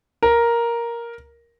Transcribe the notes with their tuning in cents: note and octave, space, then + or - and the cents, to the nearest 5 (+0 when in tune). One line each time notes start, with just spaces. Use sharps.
A#4 +5